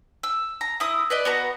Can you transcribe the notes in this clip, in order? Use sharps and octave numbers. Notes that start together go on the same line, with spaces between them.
E6
A#5
E4 D#6
B4 D5 D#5
B3 F#4 A#5